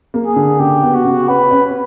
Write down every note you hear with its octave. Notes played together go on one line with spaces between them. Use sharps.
A#3
G#4
D3
C#3 G4
B3
F#4
C#3
C#4 B4
C#4